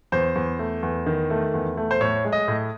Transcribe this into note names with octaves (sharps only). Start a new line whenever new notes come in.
E2 C5
E2
A3
E2
D#3
A3
E2
A3
C5
A2 C#5
G#3
D#5
A2